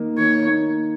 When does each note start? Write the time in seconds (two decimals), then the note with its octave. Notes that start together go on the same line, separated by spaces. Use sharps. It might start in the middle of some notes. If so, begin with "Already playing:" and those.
Already playing: D#3 A#3 D#4
0.18 D#3 C#5
0.47 A#3 D#4